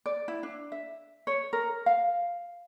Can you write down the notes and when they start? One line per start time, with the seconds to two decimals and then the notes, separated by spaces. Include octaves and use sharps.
0.06 D5
0.28 E4
0.43 D4
0.72 E5
1.27 C#5
1.53 A#4
1.86 F5